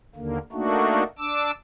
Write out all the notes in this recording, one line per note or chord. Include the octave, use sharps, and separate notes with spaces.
D#2 D3 A#3
A3 A#3 D4 D#4 F#4
D4 D6 E6